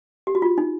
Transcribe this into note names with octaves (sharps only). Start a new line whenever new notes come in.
G4
F#4
F4
D#4